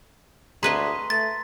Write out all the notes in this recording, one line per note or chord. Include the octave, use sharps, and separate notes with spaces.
D2 G#4 B4 D#5 A#5 C6 B6
A3 A6